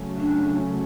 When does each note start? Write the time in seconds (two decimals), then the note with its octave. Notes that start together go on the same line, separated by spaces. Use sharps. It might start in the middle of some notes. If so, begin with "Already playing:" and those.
Already playing: C#3 F#3 A3 C#4
0.18 D4